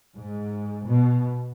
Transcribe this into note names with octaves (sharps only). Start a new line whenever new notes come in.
G#2
B2